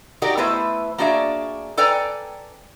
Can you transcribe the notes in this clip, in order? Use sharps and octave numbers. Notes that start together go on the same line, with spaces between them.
D#4 F#4 G4 A#4 D5
A3 B3 E4 B4 C5
A#3 D4 F#4 G#4 D5 E5
A4 B4 D5 G5 G#5 A#5